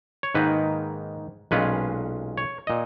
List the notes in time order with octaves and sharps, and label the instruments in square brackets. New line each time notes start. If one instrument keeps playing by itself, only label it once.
[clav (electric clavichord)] C#5
G#2 D#3 A#3 D#4 B4
B1 A#2 G#3 C#4 F4 B4
C#5
A#2 D#5